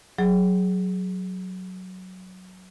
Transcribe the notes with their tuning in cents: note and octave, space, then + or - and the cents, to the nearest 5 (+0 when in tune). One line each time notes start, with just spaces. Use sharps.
F#3 +0 G#4 +0